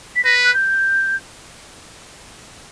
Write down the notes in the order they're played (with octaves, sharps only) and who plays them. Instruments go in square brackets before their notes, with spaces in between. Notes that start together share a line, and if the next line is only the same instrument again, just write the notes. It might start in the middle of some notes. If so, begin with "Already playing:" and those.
[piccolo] B6
[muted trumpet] B4 [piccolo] A#6
[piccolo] F#6
G6